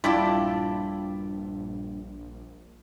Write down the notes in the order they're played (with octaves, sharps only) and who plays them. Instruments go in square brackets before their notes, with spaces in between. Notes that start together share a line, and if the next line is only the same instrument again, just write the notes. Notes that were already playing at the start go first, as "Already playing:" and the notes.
[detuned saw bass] A#1 [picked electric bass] G2 [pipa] E4 G4 A4 [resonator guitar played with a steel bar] F4 D5